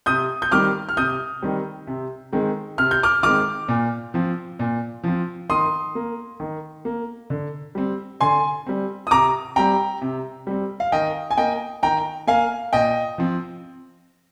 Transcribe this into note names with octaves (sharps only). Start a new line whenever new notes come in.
C3 D#6 G6
G6
D#3 G3 C4 D6 F6
F6
C3 D#6 G6
D#3 G3 C4
C3
D#3 G#3 C4
C3 F6
G6
D6 F6
D#3 G#3 C4 D6 F6
A#2
F3 C4
A#2
F3 C4
D#3 C6 D#6
A#3
D#3
A#3
D3
G3 C4
D3 G#5 C6
G3 C4
D#6
C3 A#5 D6
G3 C4 G5 A#5
C3
G3 C4
F5
D#3 D#5 G5
G#5
A#3 D#5 G5
D#3 G5 A#5
A#3 F5 G#5
A#2 D#5 G5
F3 C4